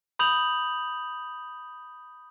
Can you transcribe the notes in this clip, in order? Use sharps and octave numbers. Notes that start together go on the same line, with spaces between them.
B5 D#6 G6 F7 F#7